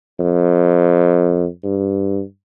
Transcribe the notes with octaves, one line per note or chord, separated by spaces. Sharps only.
F2
G2